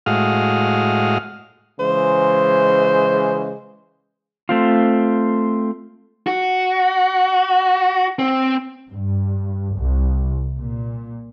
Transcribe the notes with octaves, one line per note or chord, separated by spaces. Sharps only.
A2 G#3 F#4 F5 D#6 F6
C#3 E3 G#3 C5
A3 C4 F4
F#4
C4
G2
C2
A#2